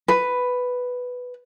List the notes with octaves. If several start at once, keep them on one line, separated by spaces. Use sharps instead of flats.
B4